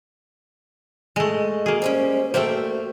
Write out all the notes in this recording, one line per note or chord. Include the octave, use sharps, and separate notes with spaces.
G#3 A3 D#5
A#3 F#4 G#4
G3 G#3 C#4 C5
A3 A#3 F#4 C5 E5 G5